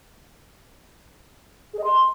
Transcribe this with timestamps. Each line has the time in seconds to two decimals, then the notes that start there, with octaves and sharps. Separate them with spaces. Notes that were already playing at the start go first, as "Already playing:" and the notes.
1.74 G#4
1.79 D#5
1.84 C6